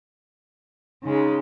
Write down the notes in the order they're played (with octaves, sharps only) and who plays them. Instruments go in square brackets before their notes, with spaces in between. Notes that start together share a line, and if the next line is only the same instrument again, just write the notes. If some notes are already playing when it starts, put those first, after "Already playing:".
[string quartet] C#3 G#3 [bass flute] D#4